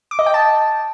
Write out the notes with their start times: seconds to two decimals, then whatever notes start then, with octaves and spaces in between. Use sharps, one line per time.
0.11 D6
0.19 D#5
0.26 G5
0.34 A5